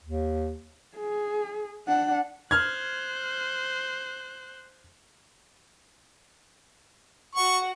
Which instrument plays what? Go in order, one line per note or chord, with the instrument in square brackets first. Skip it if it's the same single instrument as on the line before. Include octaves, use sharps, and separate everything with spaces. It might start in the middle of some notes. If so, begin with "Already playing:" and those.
[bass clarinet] D#2
[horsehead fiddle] G#4
D4 F#5
[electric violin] C5 F#6 [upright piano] F6 G#6
[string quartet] F#4 F#5 [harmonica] C#6